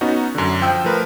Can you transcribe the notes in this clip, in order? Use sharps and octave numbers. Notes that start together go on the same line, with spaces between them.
B3 C#4 D#4 F#4
F#2 D3
F3 G5 E6 G6
F3 A3 A#4 B4